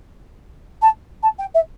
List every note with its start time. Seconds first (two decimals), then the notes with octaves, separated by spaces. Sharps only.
0.81 A5
1.22 A5
1.38 G5
1.54 E5